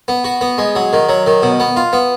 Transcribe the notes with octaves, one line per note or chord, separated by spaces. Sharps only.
B3
F#4
B3
G#3
F#3
D#3
F#3
D#3
B2
B3
F4
B3